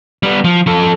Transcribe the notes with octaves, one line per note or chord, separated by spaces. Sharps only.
G3 B3
F3
F3 A4